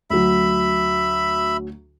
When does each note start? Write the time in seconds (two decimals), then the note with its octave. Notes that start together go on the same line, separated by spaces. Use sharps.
0.10 D2 F#3 E5 B5